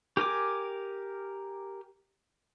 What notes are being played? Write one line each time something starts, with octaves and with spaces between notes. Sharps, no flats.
G4 A#4 G#5 D6